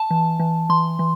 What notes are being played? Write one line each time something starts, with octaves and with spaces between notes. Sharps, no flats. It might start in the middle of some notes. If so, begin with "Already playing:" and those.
Already playing: A5
E3
E3
E3 C6
E3